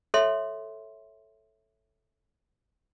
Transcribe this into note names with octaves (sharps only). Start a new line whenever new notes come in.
A4 C#5 E5 C6